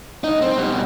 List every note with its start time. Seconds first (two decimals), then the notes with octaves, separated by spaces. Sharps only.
0.24 B1 D#4
0.42 C4
0.57 B2 G3